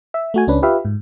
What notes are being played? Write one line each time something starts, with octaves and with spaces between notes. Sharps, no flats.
E5
A3 F#4 G#5
C#2 C#4 D4 B4
F4 G4 B4 E5 F5
G#2